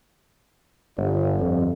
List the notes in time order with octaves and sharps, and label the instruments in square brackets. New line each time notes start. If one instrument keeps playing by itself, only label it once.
[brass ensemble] G1
F2